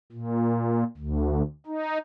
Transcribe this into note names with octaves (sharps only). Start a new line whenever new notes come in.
A#2
D2
D#4